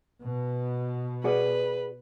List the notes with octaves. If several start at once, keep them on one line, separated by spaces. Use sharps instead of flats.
B2
F#4 G#4 B4 D5